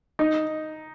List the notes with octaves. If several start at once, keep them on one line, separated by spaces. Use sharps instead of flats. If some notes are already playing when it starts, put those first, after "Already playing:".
D#4